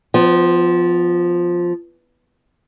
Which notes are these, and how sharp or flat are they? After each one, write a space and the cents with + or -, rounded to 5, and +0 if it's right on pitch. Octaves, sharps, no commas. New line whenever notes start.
F3 +5 B3 +40